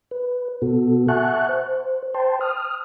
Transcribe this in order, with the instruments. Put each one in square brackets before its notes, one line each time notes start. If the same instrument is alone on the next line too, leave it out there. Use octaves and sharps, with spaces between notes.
[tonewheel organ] B4
B2 B3 F#4 A4
E5 F#5 G#5 A5 C#6 F#6
C5
C5 G5 A5 C6
D#6 F6